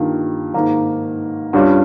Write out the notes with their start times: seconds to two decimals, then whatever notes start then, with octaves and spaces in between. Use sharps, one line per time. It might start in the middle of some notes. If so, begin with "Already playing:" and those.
Already playing: G2 D#3 A#3 F4
0.54 G#2 D#3 A#3
1.53 G2 G3 C#4 F4